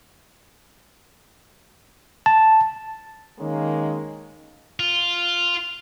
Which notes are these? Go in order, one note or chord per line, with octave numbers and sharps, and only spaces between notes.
A5
D#3 G#3 A#3 C#4
F4